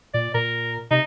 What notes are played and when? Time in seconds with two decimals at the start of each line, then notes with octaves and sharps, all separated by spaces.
0.14 A#2 D5
0.34 A#2 A#4
0.91 C3 D#4